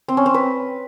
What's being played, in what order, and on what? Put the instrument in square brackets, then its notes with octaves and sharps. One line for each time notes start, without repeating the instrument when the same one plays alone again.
[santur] C4
C#4
C4
B4